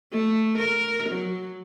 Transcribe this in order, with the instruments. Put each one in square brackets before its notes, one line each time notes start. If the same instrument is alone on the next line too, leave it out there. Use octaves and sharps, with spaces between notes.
[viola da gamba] A3
A#4
F#3